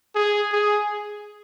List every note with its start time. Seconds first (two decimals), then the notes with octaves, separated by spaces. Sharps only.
0.15 G#4
0.52 G#4